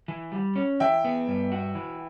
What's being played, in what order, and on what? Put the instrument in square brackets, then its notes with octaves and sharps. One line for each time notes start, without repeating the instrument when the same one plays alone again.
[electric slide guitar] E3
G3
C#4
[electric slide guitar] E3 [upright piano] E5 G5
[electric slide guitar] B3
G2
F#4
E3